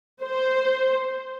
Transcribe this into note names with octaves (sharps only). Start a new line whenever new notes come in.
C5